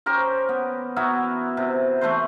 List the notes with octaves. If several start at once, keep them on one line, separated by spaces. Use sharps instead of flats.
C#4 G4 A#4 C5
B3
B3 E4 F#4 A#4
C3
E3 A3 B4 C5